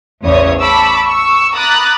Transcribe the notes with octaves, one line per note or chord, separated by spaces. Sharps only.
A1 E2 C#3 C5 C#5 D#6
A5 B5 C#6 D6 E6
C#6 E6
A#5 B5 D6 D#6 F#6 A6